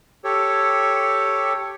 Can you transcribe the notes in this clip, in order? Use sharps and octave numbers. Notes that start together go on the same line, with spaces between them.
G4 A4 C#5